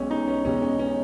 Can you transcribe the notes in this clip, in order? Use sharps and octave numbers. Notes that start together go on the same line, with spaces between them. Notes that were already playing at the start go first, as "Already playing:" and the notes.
Already playing: B1 B2 G#3 C#4
D#4
C#4
B1 B2 G#3 C#4
C#4
C#4